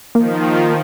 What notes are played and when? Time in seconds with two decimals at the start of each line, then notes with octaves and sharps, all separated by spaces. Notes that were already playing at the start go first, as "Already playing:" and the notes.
0.15 D#3 F3 A#3